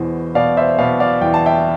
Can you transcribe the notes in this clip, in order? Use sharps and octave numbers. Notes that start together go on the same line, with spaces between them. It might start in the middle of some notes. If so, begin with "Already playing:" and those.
Already playing: E2 B2 C5
B2 D5 F5
C5 E5
B2 D5 F5
D5 F5
E2 G5
A5
E5 G5